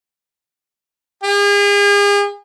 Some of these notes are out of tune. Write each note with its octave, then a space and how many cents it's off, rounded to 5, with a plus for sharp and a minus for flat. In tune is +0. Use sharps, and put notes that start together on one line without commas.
G#4 -40